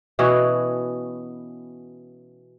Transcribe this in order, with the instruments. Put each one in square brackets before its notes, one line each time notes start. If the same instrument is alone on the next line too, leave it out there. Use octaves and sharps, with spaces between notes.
[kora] B2 E3 C#4 F#4